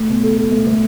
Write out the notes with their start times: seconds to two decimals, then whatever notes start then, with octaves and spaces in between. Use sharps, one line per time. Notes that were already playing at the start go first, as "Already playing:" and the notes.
Already playing: A3
0.08 B2
0.23 A4
0.37 A4
0.52 A3
0.66 A3